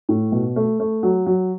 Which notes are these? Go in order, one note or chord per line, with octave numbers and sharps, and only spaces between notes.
A2
B2
A3
A3
F#3
F#3